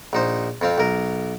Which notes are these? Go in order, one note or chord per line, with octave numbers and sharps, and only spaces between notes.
A#1 D#4 C5
F2 C4 F5
B1 A#4